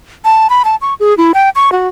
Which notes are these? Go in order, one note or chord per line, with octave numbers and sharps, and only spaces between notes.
A5
B5
A5
C#6
G#4
E4
G5
C#6
F#4